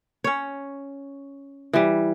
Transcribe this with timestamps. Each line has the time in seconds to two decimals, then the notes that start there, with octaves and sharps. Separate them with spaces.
0.24 C#4 C#5
1.73 E3 G3